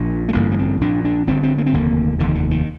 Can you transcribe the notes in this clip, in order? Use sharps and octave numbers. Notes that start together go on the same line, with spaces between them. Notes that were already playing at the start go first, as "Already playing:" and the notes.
Already playing: A#1 A#2 D4
A3
A1 G2 D3 A#3
A#3
C4
A#1 A#2 D4
D4
G1 G2 D3 C4
C4
A#3
C4
F1 D#2 D3 A#3
F1 D#2 D3 D#3
D3
D#3